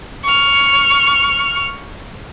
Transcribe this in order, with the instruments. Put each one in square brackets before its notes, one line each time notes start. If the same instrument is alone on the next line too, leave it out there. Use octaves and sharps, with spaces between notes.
[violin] C#6 F6